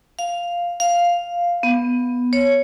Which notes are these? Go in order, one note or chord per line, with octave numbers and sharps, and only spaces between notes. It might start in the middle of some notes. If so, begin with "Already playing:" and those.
F5
F5
B3
C#5